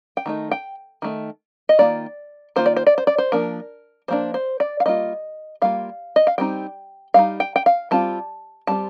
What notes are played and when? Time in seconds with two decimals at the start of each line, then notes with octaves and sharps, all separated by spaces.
0.17 G5
0.26 D#3 A3 D#4
0.51 G5
1.02 D#3 A3 D#4
1.69 D#5
1.79 D#3 A#3 F4 D5
2.56 D#3 A#3 F4 C5
2.66 D5
2.76 C5
2.87 D5
2.98 C5
3.07 D5
3.18 C5
3.32 F3 A#3 D4 A#4
4.08 F3 A#3 D4 C5
4.34 C5
4.60 D5
4.80 F5
4.86 G3 A#3 F4 D#5
5.62 G3 A#3 F4 F5
6.16 D#5
6.27 F5
6.38 G3 C4 D#4 G5
7.14 G3 C4 D#4 F5
7.40 G5
7.56 G5
7.66 F5
7.91 G3 C4 F4 A5
8.67 G3 C4 F4 A5